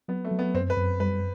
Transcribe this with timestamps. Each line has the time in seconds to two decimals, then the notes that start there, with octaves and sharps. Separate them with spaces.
0.08 F#3 B3
0.25 A3
0.31 F#3
0.39 B3
0.54 F#2 C4
0.70 B4
0.77 F#2
1.00 G3 B4